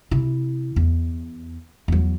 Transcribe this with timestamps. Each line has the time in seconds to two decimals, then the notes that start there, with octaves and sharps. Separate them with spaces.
0.11 C3 E4
0.76 E2
1.88 E2 F#3